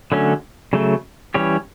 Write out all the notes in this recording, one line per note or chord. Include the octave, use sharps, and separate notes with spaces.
D3 F#3 A3 C#4
C#3 F#3 A3
E3 G3 C#4 G4 C#5